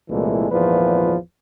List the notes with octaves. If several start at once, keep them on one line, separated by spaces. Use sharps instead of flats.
C2 A#2 E3 G#3 A3
G#1 E2 A#2 F3 B4